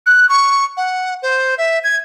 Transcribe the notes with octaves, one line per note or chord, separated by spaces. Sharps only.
F#6
C#6
F#5
C5
E5
G#6